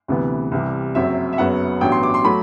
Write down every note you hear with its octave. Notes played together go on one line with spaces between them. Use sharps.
D2 C3 E3 B3
C2 C3 E3 G3
F#1 F#2 F#3 C4 E5
E5
F#1 F#2 F#3 B3 F#5
A1 G2 F#3 B3 G5
C6
D6
C6
F#3 A3 B5